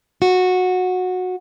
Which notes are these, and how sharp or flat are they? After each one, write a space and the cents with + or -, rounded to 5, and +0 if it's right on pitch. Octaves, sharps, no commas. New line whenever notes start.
F#4 -15